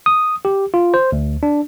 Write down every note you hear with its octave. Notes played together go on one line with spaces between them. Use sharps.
D#6
G4
F4
C5
D2
D4